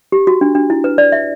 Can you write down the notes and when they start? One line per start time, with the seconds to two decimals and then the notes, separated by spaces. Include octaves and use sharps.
0.12 G4
0.27 F#4
0.41 D4
0.55 D4
0.70 E4
0.84 B4
0.98 D5
1.12 E5